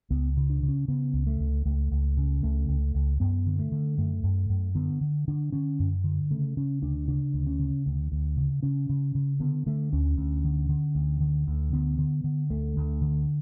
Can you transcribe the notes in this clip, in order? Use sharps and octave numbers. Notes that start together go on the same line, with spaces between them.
C#2 B3
C#3
D4
C#3
C#4
C#3 B3
C#2
A3
C#2
C#2 A3
C#2
C#3
C#2 A3
C#2
C#2
F#2 B3
D3
A3
D3
F#2 A3
F#2
F#2
D3 B3
D3
D3 D4
D3 C#4
F#2
D3
C#3 A3
C#3 C#4
D2 D4
C#3 D4
D2
C#4
C#3
D2
D2
C#3
C#3 C#4
C#3
C#3
D3 B3
D3 A3
D2 C#4
D2
D3
D3
D2
D3
D2
D3 B3
D3
D3
D2 A3
D2
D3